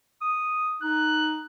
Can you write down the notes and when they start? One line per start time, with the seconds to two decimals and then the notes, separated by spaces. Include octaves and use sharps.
0.21 D#6
0.83 D#4 F#6